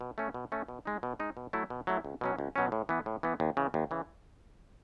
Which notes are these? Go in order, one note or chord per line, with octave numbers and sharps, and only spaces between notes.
B2
A3 C#4
B2
A3 C#4
B2
G#3 D#4
B2
G#3 D#4
B2
F#3 A3 E4
B2
F#3 A3 E4
C#2
B2 F#3 C#4
C#2
B2 F#3 C#4
A2
E3 B3
A2
E3 B3
D#2
C#3 E3
D#2
C#3 E3